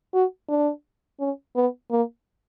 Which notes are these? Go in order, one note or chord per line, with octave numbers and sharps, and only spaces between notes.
F#4
D4
C#4
B3
A#3